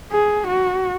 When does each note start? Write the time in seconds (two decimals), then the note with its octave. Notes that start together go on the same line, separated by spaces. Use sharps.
0.12 G#4
0.47 F#4